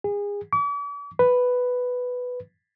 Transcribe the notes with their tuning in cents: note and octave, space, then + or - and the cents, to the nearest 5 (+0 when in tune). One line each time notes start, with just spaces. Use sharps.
G#4 -30
D6 -45
B4 +5